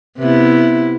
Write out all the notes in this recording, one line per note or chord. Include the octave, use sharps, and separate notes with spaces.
C3 B3 E4